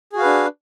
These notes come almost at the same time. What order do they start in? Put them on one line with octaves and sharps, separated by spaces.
G#4 F#4 F5 B4 D4